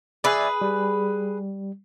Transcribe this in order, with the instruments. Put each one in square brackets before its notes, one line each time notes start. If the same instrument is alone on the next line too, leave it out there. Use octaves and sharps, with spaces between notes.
[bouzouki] G#4 B4 [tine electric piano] D5 E5 G#5
[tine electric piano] G3